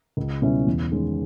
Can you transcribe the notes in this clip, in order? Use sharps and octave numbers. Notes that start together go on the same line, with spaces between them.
C#2
B2 G3 C#4 E4
E2
D#3 G#3 C#4